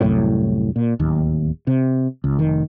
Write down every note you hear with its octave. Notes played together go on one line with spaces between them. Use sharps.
C2 F#2 A2
A#2
D1 D#2
C3
C#2
F1 D#3